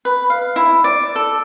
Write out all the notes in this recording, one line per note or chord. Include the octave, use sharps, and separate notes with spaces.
B4
F5
E4
D5
A4